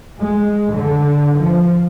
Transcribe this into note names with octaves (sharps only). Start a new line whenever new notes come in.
G#3
D3
F3